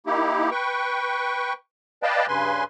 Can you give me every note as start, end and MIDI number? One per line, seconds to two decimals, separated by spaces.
0.06 0.50 58
0.06 0.50 63
0.06 0.50 64
0.06 0.50 67
0.51 1.53 71
0.51 1.53 79
0.51 1.53 85
2.03 2.26 71
2.03 2.26 74
2.03 2.26 75
2.03 2.26 77
2.03 2.26 79
2.03 2.26 81
2.28 2.64 43
2.28 2.64 49
2.28 2.64 71
2.28 2.64 80
2.28 2.64 84